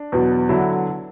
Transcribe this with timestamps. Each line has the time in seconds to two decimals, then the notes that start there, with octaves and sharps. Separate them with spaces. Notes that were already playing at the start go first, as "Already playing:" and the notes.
Already playing: D4
0.12 E2 B2 F#3
0.49 D3 F#3 E4